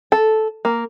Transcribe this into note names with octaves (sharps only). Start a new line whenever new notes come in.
A4
A#3